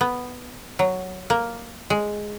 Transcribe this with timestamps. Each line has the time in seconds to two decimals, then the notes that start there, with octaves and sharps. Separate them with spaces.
0.01 B3
0.79 F#3
1.30 A#3
1.90 G#3